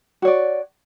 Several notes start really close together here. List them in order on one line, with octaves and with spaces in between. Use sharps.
F#4 C#5 D5